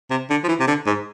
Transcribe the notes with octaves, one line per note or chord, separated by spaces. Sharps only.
C3
D3
F3
E3
C3
D3
G#2